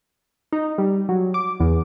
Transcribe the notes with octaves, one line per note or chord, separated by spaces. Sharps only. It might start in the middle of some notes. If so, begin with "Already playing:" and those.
D#4
G3
F#3
D6
E2